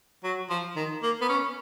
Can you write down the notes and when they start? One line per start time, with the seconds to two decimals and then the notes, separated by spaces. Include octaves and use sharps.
0.24 F#3
0.50 F3
0.76 D#3
1.03 A#3
1.21 B3
1.29 C#4